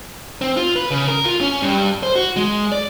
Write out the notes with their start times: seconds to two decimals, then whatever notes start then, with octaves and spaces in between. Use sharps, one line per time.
0.41 C4
0.57 F4
0.76 B4
0.91 C#3
1.08 A#4
1.25 F4
1.41 C#4
1.62 G2
2.03 C5
2.15 F#4
2.36 G#3
2.72 D5